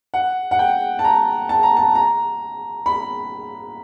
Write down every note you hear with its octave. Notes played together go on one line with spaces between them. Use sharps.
F#5
F#5
G5
A5
A#5
A5
A#5
A5
A#5
B5